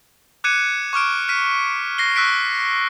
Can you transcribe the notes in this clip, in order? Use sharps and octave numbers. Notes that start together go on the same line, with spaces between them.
D6 F#6 G#6 C#7 D#7 E7
C#6 D6 F6 D7
F6 B6 D#7
A#6 C7 G7
C#6 E6 F#6 B6 D7